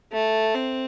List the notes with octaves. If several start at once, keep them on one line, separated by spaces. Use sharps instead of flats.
A3
C4